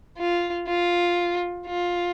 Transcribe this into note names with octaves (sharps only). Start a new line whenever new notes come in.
F4
F4
F4